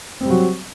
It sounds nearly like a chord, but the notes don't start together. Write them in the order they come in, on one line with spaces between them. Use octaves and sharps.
C4 G3 F#3